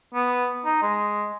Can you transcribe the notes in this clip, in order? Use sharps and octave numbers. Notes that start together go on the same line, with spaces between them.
B3
D#4
G#3